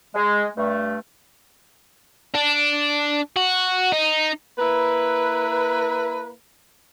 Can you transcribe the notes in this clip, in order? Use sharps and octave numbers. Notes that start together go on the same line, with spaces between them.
G#3
G2 A3
D4
F#4
D#4
A#3 E4 B4